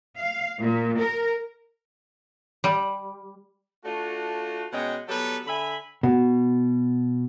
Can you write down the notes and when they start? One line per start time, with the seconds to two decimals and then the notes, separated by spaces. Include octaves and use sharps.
0.18 F5
0.59 A#2
0.98 A#4
2.64 G3
3.85 A3 D4 F4 F#4
4.72 B2 G#3 C#4 D#5 F#5 G5
5.08 F#3 G3 B3 G4 A4 B4
5.46 D3 E5 G#5 B5
6.03 B2